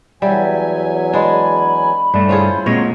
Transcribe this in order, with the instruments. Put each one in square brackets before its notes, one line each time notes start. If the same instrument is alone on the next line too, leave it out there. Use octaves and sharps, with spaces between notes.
[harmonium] E2 F#3 G#5 [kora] G3 [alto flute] E5
[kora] G#3 D4 [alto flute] B5
[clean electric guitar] G2 A3 [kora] D4
[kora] C#4 F4 G#4 [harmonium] E4 C5
[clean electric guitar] A#2 G#3 [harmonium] F#3 [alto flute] C4 [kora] C#5